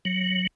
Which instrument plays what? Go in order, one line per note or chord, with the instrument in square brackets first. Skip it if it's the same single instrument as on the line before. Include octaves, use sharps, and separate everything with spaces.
[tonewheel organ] F#3